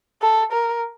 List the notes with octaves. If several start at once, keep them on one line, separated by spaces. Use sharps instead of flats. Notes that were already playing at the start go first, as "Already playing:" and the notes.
A4
A#4